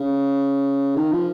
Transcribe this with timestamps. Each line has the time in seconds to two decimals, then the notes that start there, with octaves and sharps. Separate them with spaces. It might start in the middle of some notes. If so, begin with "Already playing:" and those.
Already playing: C#3
0.96 D#3
1.12 F3